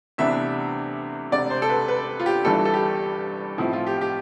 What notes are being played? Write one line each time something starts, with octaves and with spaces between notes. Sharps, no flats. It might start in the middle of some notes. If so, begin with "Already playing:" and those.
D2 C3 E3 B3 D4 E5
E1 D2 C3 D5
C5
A4
B4
B4
F4
G4
G1 G2 E3 A4
A4
G4
B1 A2 F3 C4 E4
F4
G4
G4